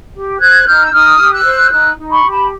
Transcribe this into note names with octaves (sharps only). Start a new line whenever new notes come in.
G4
C5 F#6 G#6
D#4 F6 G6
E6
D#4 D#6 F6
G4
E6 F#6
C5
D#4 E6 F#6
D#4
B5 C#6
G4
A5 B5